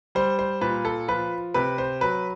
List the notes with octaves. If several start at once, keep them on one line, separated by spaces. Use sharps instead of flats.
G3 C5
C5
A#2 B4
A4
F3 B4
C3 B4
C5
F#3 B4